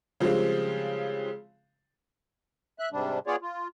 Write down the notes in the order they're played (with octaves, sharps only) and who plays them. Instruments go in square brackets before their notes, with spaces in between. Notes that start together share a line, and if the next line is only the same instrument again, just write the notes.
[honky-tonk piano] C#3 F3 G3 G#3 C4
[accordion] E5 F#6
G#2 C3 G3 D4
B3 F4 G#4 C#5 D5
F4